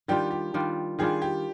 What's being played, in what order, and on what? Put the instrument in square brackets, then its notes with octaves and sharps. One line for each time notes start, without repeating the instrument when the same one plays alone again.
[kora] D#3 G3 D4 F4 [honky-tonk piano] G4
[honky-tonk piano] G4
[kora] D#3 G3 D4 F4
[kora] D#3 G3 D4 F4 [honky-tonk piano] G#4
[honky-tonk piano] G4